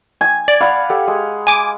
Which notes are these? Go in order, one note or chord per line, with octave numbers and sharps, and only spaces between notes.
G#5
D5
F5 F#5 B5 D6
G4 A4 F#5
G#3
G#5 D6